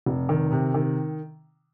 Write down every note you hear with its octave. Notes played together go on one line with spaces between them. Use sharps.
F1
D#3
C3
D#3